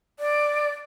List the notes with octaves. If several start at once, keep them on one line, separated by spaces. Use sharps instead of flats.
D5